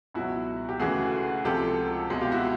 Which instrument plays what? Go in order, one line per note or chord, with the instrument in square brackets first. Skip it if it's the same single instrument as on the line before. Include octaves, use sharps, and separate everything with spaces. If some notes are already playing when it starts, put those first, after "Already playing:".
[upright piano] C#2 B2 F#3 E4 F#4
G4
D2 C#3 E3 A3 F#4 G#4
C#2 C3 F3 G#3 G4 A4
C2 B2 G#3
F4 G4
E4 F#4